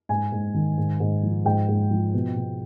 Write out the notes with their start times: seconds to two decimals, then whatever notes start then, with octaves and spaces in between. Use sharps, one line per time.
0.09 G#2 G#5
0.32 G#2
0.54 D#3
0.78 G#2
1.00 G#2
1.23 F3
1.45 G#2 G5
1.68 G#2
1.91 F3
2.14 B2
2.36 B2